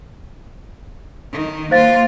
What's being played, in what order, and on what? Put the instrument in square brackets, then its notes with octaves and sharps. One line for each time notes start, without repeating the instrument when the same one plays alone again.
[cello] D#3
[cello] A#3 F4 [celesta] C5 F5 A6